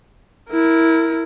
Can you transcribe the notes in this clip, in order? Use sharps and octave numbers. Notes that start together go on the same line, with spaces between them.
E4 A#4